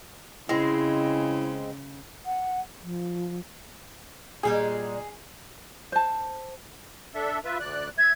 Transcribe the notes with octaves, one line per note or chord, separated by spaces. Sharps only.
C#3 G#3 C4 E4
F#5
F3
A#2 G3 G#3 G#4
C5 A5
D4 A4 E5
F4 B4 E5
D2 D5 F#6
E5 G#6